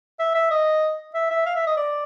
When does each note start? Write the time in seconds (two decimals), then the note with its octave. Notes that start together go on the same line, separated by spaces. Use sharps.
0.19 E5
0.35 E5
0.51 D#5
1.14 E5
1.30 E5
1.46 F5
1.55 E5
1.67 D#5
1.77 D5